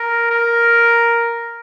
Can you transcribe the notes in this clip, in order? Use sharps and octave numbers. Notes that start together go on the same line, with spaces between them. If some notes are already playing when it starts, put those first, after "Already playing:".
Already playing: A#4
A#4